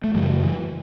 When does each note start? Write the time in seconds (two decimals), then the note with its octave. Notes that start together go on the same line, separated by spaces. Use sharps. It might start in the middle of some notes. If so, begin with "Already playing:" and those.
0.04 A3
0.14 F#2 C#3 E3 G3
0.44 E3